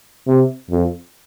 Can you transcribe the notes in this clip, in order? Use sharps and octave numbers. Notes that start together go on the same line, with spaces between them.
C3
F2